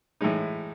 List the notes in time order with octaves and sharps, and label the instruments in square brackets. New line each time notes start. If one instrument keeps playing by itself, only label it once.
[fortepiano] A2 E3 G#3 D#4